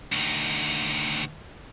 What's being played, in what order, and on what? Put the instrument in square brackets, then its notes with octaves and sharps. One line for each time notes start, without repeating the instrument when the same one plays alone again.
[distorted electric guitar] D2 D#3